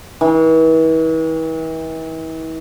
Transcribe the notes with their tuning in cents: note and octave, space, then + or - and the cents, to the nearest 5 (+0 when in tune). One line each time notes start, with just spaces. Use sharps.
E3 -40